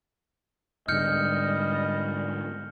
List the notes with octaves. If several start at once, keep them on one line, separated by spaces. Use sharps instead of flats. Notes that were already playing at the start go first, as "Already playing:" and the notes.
G#2 D3 G3 D#5 F6 G6 C#7